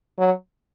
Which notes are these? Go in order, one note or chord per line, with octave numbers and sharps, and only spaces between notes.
F#3